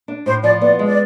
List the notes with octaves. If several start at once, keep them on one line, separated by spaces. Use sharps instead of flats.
D4
A2 C5
F3 D5
B3 D5
G#3
D5